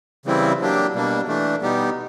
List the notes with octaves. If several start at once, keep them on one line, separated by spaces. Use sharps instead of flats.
C#3 E3 G3 C4 E4
F#3 A#3 D4 G4
B2 G3 A#3 D4
E3 A3 D4
B2 G3 B3 D#4 G4